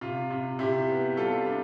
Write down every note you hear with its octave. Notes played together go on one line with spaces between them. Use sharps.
C3 F4
C3
C3 E4 G4
B3
G3 F4 A4
D4